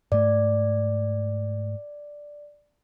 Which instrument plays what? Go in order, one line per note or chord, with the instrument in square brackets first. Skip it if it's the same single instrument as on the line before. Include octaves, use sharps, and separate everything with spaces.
[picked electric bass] G#2 A3 [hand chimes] D5